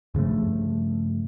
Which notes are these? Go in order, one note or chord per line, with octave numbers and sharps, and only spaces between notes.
G2 C#3 F3 A3